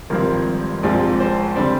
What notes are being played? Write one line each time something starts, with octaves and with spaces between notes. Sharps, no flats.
G#1 G2 F3 C4 A#4
A#1 G#2 F3 C4 D5
C5
D3 G3 C4 D5